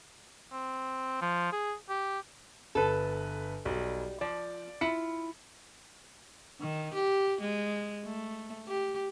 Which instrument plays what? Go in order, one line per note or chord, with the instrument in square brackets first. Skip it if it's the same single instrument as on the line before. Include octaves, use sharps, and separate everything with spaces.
[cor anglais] C4
F3
G#4
G4
[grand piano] G1 B4 [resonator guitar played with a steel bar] A4
[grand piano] B1 [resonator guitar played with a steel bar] G3
[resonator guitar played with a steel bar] F3 [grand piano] D5
[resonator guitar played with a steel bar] E4 F4 [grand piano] C#7
[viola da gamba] D#3
G4
G#3
A3
G4